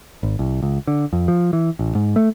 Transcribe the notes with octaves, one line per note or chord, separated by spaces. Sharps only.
G#1
C2
C#2
D3
F2
F3
E3
A1
G#2
A3